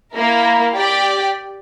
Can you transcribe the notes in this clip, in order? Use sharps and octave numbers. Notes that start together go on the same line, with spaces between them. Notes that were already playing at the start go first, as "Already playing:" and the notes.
A#3 E4 A#4
G4 D5 G5